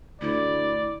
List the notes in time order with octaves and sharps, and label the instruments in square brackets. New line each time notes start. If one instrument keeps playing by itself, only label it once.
[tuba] D2 [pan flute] E4 [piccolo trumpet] D5